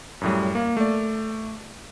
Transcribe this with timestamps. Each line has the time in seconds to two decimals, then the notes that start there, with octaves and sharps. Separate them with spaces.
0.21 F#2 A2 G3
0.55 A#3
0.77 A3 D5